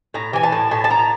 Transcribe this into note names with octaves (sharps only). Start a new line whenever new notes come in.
A2 A#5
E3 G#5
A5
A2
A2 A5
A5
A2 A#5